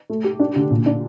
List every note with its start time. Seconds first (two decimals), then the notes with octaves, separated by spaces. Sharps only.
0.10 A3
0.24 G4
0.40 D4
0.56 D3
0.70 A#2
0.86 D4